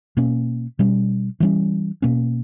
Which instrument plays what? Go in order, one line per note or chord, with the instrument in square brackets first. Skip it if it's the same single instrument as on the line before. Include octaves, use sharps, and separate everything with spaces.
[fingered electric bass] B2 A#3 C#4
B2 G3 C#4
E3 G3 C#4
B2 A#3 C#4